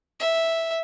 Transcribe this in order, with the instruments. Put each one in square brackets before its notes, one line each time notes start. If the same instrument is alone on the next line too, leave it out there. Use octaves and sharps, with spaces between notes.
[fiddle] E5